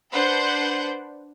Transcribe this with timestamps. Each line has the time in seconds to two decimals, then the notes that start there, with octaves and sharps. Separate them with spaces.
0.12 D4 B4 C5 F#5 G6